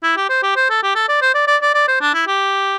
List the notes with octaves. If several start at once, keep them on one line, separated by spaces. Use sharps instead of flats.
E4
G4
C5
G4
C5
A4
G4
A4
D5
C5
D5
D5
D5
D5
C5
D4
E4
G4